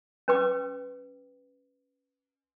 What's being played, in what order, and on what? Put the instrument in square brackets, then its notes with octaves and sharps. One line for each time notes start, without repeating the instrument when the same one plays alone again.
[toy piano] C#4 B4 G5 D6